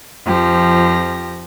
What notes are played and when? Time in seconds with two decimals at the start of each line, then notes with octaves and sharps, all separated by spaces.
0.24 F2 F3 G4 A#6